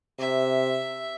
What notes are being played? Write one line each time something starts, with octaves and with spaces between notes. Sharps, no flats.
C3 E5